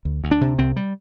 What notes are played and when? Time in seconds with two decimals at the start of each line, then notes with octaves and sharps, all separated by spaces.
0.05 D2
0.24 D2
0.31 D4
0.41 C3
0.59 C2 C4
0.76 G3